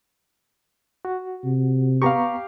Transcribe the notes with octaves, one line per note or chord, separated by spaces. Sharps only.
F#4
C3
B3 G4 F5 A#5 C#6